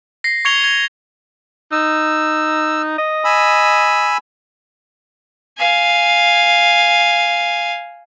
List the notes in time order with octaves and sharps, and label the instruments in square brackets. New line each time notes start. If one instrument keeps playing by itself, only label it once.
[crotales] A#6 C7
C#6 G#6 C#7 F7 G7
G#6
[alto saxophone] D#4 [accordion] E6
[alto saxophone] D#5
[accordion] G#5 B5 E6
[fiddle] F5 G#5